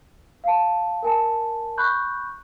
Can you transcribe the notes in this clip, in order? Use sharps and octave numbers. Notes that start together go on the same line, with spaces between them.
F5 A5
A#4 G#5 A5
B5 C#6 F#6 G6